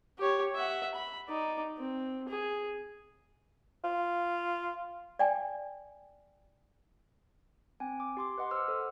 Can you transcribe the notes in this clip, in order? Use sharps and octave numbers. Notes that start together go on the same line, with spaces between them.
G4 C#5
E5 F#5
B5
D#4 D5
C4
G#4
F4
D5 G5 G#5
C4 G5 G#5
D6
G4 C6 D6
B4 D#5 F#5 C6
C5 D6 E6 F6
A4 C5